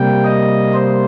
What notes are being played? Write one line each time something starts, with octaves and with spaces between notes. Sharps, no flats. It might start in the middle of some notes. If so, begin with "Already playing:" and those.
Already playing: C3 G3 A#3 G5
D#5
C5